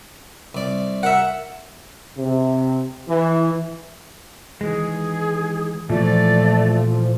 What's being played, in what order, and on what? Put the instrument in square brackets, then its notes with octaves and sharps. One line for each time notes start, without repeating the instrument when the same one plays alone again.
[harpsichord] C2 D5
[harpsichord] A#4 E5 [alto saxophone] F#5
[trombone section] C3
E3
[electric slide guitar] D#3 E3 G#3 [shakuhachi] G#4
[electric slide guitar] A#2 E3 [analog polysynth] F3 [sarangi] A3 [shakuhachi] D5